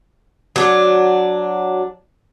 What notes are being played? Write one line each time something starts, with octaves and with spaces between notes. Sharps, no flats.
F#3 D4